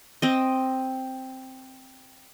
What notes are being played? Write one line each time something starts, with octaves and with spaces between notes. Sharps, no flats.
C4 D#5